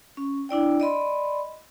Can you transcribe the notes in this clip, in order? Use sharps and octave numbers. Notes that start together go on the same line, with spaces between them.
C#4
D4 E4 D5 G5
D5 D#5 B5 C6